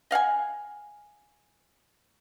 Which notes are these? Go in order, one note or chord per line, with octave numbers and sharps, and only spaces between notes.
D#5 F5 F#5 G#5